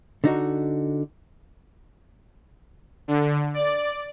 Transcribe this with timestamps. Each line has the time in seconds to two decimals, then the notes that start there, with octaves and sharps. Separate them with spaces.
0.24 D3 D#4 F#4
3.08 D3
3.54 D5